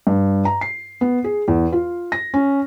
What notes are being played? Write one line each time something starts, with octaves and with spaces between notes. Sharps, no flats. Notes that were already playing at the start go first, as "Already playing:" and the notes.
G2
A#5
C7
B3
G#4
E2
F4
A#6
C#4